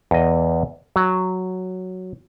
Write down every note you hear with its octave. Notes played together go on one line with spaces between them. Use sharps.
E2 D#5
F#3